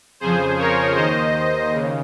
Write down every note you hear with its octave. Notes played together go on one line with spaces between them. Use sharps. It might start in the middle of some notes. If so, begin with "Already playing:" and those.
F2 C#3 F3 G#4 C5
A#4 C#5
D#2 D#3 C5 D#5
D#2 C#3